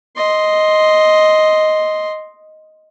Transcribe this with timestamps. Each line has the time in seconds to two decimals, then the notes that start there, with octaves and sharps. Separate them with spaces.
0.17 D#5 C6